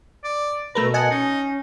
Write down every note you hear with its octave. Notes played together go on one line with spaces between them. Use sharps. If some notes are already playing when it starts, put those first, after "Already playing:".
D5
B2 A3 A#4 B4 A#5
D#5 F#5 G#5 A5
C#4 D#4